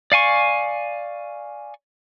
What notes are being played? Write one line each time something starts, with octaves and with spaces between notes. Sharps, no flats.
D5 F5 G#5 C#6